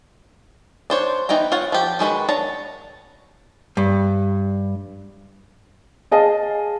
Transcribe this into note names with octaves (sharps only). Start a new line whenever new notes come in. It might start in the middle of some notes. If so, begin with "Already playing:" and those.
D4 C5 C#5
E3 B3 D#4 G5 A#5
F4 C#5 F#5
F3 G4
D#3 G#3 C#4 F#4 B4
D4 C#5 A5 A#5
G2
G#4 D#5 F5 A5